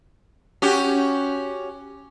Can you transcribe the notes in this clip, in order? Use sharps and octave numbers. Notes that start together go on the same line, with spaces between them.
C#4 F#4 G4